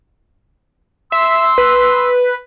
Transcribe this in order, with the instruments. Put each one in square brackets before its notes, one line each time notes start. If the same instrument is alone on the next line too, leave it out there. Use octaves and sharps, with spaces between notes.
[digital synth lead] E5 [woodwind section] C6 E6
[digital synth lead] B4